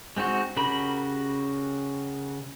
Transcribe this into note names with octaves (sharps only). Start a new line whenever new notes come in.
G#3 C4 D#4 F#4
C#3 F#4 G4 A#4 B5